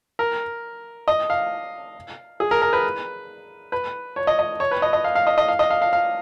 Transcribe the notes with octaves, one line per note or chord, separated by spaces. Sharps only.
A#4
D#5
F5
G#4
A#4
A#4
B4
B4
C#5
D#5
D#5
C#5
B4
D#5
D#5
F5
F5
D#5
D#5
F5
D#5
F5
F5
F5